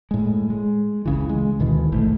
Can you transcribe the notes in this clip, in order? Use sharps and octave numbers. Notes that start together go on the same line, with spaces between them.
A2 G#3
G#3
C#2 C#3 E3
G#3
D2 B2 D#3 E3
A#1 G#2 A3